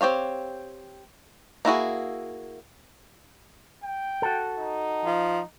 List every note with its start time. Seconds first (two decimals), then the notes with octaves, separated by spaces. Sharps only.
0.01 C4 G4 C#5 F5
1.65 A#3 E4 F#4 G#4
3.83 G5
4.22 F#4 A4
4.58 D#4
5.05 F3